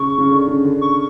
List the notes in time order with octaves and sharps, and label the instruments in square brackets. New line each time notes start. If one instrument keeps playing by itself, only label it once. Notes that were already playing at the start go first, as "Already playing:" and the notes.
Already playing: [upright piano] C#3 [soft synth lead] C#6
[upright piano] C#3
D3
C#3
D3
[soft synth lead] C#6